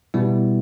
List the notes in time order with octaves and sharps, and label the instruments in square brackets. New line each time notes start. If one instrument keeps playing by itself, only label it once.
[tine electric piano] B2 G3 B3 E4